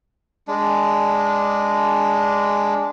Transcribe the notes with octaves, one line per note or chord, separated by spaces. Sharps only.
G#3 D4